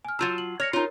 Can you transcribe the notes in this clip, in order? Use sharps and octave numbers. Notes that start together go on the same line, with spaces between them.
G#5 F6
F#3 F4 A5 E6 G6 A6
F#7
C#5 F6 A#6 C#7
D#4 F4 A#4 C#5